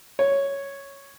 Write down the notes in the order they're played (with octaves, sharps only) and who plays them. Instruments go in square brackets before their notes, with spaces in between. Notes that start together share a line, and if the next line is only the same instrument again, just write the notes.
[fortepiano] C#5